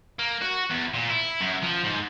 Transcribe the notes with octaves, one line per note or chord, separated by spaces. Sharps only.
A#3
F#4
E2
A#2
E4
F#2
F3
G#2